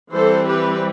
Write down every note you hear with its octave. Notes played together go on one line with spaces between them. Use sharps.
E3 G3 C4 A4 C5
G4 B4